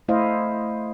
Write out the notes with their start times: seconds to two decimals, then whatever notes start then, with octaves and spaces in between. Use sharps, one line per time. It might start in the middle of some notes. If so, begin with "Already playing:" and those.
0.08 A3 E4 C5 D#5 F5